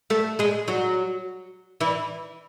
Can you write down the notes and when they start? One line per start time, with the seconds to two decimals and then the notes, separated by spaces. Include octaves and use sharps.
0.10 A3 A4
0.39 G#3 G#4
0.68 F#3 F#4
1.80 E3 E4